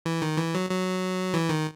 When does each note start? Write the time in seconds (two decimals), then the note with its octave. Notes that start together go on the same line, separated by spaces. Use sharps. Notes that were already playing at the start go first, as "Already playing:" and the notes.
0.06 E3
0.22 D#3
0.38 E3
0.54 F#3
0.69 F#3
1.34 E3
1.49 D#3